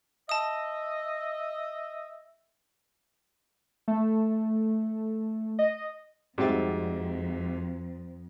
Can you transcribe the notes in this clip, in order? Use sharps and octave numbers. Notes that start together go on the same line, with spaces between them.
D#5 E5 A5 D#6
A3
D#5
F2 G#2 G3 C4 F#4 G4 E5 A6